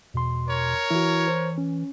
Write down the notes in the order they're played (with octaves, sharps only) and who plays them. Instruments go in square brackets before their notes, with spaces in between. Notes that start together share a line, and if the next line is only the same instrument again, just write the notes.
[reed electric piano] E2 C6 [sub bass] B2
[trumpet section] A#4 C#5
[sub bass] E3 [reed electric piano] E4 F#4
[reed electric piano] C5
C#4